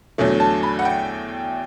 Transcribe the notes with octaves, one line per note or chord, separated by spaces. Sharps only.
E2 D3 F#3 A3
A5
B5
F#5
G5